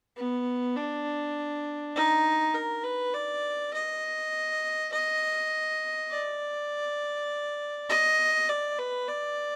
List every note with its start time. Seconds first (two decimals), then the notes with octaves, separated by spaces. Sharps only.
0.17 B3
0.76 D4
1.95 D#4
2.54 A#4
2.84 B4
3.14 D5
3.73 D#5
4.92 D#5
6.11 D5
7.89 D#5
8.49 D5
8.78 B4
9.08 D5